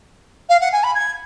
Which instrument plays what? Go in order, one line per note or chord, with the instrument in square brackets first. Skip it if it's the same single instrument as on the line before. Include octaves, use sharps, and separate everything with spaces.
[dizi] F5
F#5
G#5
B5
G#6